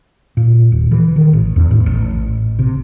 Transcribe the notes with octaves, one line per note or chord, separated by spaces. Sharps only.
A#2
D#1
E3
D#3
A1
E2
A2
A1
C3